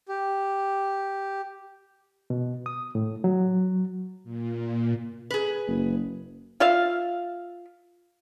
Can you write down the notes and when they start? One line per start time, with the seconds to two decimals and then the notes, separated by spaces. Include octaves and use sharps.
0.08 G4
2.30 B2
2.66 D#6
2.95 A2
3.24 F#3
4.24 A#2
5.30 G#4 B4
5.68 F#1
6.60 F4 E5 F5